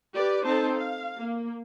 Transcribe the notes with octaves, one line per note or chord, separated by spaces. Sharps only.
G4 B4 D5
C4 D#4 A4 C5 A5
F5
A#3